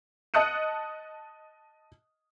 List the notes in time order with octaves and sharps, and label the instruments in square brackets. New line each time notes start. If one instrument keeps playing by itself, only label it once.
[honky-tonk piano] D#5 A5 D#6 F#6 C#7 D#7